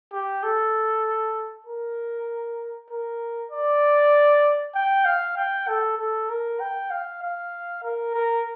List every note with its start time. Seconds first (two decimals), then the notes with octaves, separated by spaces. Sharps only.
0.13 G4
0.43 A4
1.66 A#4
2.90 A#4
3.51 D5
4.75 G5
5.05 F5
5.37 G5
5.68 A4
5.98 A4
6.29 A#4
6.60 G5
6.91 F5
7.22 F5
7.83 A#4
8.14 A#4